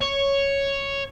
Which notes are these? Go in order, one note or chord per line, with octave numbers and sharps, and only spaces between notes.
C#5